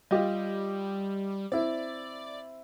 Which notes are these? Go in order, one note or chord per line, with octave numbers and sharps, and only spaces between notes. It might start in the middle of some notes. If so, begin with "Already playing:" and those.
G3 F4 G4 D#5
C4 E4 D5